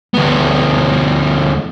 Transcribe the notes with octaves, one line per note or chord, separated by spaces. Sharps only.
D2 B3